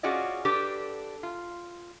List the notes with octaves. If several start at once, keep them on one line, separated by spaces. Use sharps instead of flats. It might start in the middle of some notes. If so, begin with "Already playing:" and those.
C#4 F4 F#4 G#4 D5 D#5
D4 G4 A4 B4
F4